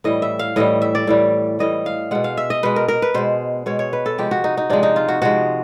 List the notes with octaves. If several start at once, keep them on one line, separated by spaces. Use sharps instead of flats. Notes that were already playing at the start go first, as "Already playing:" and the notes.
A2 E3 G3 D#5
E5
F5
A2 E3 G3 D#5
E5
D5
A2 E3 G3
A2 E3 G3 D#5
F5
B2 G#3 F#5
F5
E5
D#5
B2 G#3 B4
A#4
A#4
B4
B2 G#3 C5
B2 G#3 C#5
C#5
B4
A4
C3 F3 G#3 G4
F#4
D#4
D#4
C3 F3 G#3 D4
D#4
F4
F#4
C3 F3 G#3 F#4